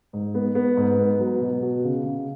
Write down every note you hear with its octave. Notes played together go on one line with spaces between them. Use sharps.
G#2
B3
B3
G#2
B3
F#3
B2
F#4
C#3
C#3